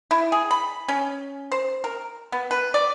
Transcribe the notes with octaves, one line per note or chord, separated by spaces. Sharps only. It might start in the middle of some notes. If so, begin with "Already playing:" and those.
E4
G#4
B5
C#4
C5
A#4
B3
B4
D5